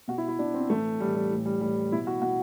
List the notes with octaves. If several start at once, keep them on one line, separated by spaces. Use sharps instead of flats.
B2 F#4
E4
E4
B2 D4
C4
A2 E3 A3
A2 E3 G3
G3
A2 E3
G3
A2 E3 G3
B2 E4
F#4
B2 F#4